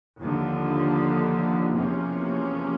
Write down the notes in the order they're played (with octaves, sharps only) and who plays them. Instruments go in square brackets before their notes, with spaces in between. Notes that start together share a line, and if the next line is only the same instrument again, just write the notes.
[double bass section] D#2 D3 F3
E2 C3 F3 A#3 C#4